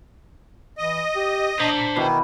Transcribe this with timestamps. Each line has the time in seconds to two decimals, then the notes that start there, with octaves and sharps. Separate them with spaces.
0.78 E3 D#5
1.15 G4
1.60 D4 C5 A#5
1.96 B2 D#3 E3